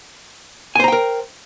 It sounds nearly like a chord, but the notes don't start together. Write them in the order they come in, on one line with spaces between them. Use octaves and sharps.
G#5 C5 A#5 G5 A#4